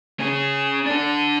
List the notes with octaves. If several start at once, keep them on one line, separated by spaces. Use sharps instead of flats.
C#4 G#4
D4 A4